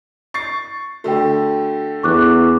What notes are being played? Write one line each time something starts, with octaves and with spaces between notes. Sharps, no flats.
C#6 A6 C7
D3 A3 F#4 G5
E2 C#6 D6 F#6